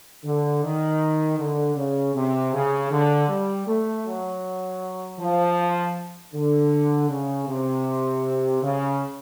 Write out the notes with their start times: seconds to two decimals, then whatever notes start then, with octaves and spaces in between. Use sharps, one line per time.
0.24 D3
0.63 D#3
1.38 D3
1.76 C#3
2.15 C3
2.53 C#3
2.91 D3
3.28 G3
3.67 A3
4.06 F#3
5.19 F3
6.34 D3
7.09 C#3
7.48 C3
8.63 C#3